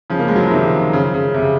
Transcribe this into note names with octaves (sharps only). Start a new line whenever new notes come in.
C#3 F3
A#3
G#3
F#3
F3
C3 D#3
C#3
C#3
C3
C#3